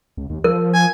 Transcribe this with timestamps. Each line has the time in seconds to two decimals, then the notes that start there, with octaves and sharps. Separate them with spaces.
0.17 C#2
0.30 D#2
0.44 F3 A#4
0.74 G#5